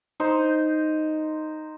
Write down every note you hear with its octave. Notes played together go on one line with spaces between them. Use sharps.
D#4 C5